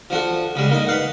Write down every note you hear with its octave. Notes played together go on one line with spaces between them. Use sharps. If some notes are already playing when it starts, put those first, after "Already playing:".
F3 D4 F#4 A4
C#3 G3 G#3
A#3 D#4 D#5
B4 F5 F#5